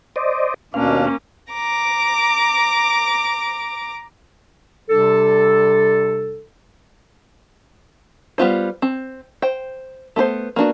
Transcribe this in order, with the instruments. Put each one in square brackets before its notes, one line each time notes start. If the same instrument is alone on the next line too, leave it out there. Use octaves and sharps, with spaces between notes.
[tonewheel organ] C5 D5 D#5
[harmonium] D#2 B2 D4 [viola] A#3 C#4 [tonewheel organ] F5
[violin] A#5 D6
[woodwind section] C3 G3 D4 A4
[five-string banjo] G3 B3 F4 C5
C4
C5 G5
A3 B3 B4 C5
A#3 B3 D4 F#4